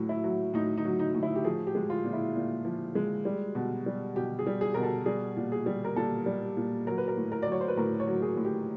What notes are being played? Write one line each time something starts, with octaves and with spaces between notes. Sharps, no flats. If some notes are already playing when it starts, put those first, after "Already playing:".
Already playing: A2 F#3
E4
F#3
A2 D#4
D#4
F#3
D#4
A2
E4
G4
F3 G#4
G4
G#3
F4
A#2
E4
A#2
F3
G#3
G3
B2
G3
B2 G4
G#4
G3
G#4
B2 A#4
A4
G3 G#4
A#2
G#4
G3
A#4
A#2 A4
G3
A#2
F#3 A#4
B4
A#4
A2
A#4
D5
F#3 C#5
C5
B4
A2 A#4
C#5
F#3
G#4
A2
G4